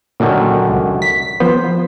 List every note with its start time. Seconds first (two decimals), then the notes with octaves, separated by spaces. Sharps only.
0.20 F#2 A#2 D3 D#3
0.70 C#2
1.02 B6
1.40 F3 B3 C5